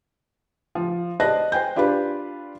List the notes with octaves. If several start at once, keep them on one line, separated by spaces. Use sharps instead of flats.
F3
C5 D5 D#5 A5 F#6 A#6
C5 G5 G#5 G6
D4 F4 G4 B4 B5